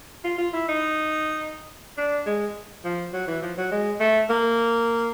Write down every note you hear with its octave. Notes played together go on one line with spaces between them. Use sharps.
F4
F4
E4
D#4
D4
G#3
F3
F#3
E3
F3
F#3
G#3
A3
A#3